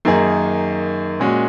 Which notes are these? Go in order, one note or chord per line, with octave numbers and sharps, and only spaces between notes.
F#2 D#3 A#3 D#4 G#4
A#2 G#3 C#4 F#4